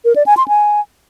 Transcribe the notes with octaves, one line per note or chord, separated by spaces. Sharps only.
A#4
D5
G#5
C6
G#5